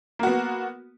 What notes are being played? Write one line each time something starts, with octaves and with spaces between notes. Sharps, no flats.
A#3 B3 F#4